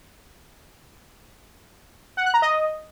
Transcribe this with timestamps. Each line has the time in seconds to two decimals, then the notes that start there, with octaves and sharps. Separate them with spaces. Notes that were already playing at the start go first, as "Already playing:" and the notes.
2.17 F#5
2.25 F#6
2.34 A#5
2.42 D#5